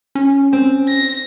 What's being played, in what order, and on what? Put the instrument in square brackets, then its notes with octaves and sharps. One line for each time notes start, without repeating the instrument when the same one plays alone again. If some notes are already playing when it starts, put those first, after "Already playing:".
[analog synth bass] C#4
[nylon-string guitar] C4
[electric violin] A#6